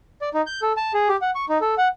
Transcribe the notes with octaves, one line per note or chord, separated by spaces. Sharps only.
D5
D#4
G6
A4
A5
G#4
G4
F#5
C#6
D#4
A4
F#5